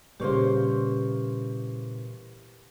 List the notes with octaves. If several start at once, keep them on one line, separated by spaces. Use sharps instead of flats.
A#2 C#3 E3 G3 A#3 G4 C5 C#6